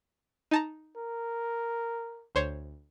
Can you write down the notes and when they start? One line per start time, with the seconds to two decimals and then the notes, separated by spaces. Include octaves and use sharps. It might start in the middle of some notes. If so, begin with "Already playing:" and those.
0.51 D#4 A5 A#5
0.97 A#4
2.35 D2 C5 C#5